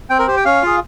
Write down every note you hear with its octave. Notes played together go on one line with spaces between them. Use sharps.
C4 G5
A#4
G4 C5
G5
C#4 F5
F4 G#4